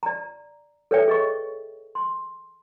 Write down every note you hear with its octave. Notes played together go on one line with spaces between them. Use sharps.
D5 A#5
A4 B4 C#5 D5 E5 G5
G#4 D#5 C#6
C6